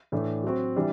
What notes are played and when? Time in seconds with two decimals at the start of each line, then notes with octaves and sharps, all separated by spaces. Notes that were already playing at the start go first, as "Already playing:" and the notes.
0.12 A2 E3 A3 D4
0.44 F#3 C4 F#4
0.76 E3 G3 D4